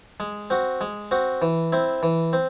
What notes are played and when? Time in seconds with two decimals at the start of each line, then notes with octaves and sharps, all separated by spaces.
0.20 G#3
0.50 C4 F#4
0.81 G#3
1.11 C4 F#4
1.42 E3
1.73 C4 E4
2.03 E3
2.33 C4